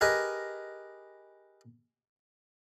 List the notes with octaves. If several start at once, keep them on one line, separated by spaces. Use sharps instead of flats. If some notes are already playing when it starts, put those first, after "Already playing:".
G4 G#4 A#4 B4 D#5